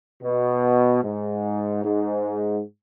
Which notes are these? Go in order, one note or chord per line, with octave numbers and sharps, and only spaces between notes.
B2
G#2
G#2